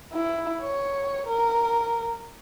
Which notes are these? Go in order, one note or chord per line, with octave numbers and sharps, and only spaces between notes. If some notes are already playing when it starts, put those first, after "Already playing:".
E4
C#5
A#4